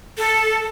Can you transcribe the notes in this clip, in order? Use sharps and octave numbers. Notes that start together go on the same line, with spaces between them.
A4